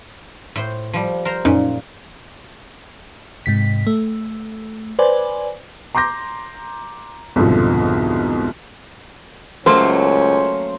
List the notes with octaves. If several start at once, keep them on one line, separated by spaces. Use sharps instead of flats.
A2 C5
F3 G3
A#4 C5 A#5
F#2 A#2 C#4 D#4
G#2 C3 B6
A3
B4 C5 D5 G#5
A#5 C6 D6 G6 A#6
C2 F2 G#2 B2 D3 F3
C#2 F#3 A3 A#3 C#4 C5